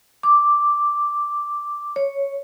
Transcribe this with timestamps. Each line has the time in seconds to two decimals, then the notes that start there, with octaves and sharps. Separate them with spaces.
0.23 D6
1.96 C#5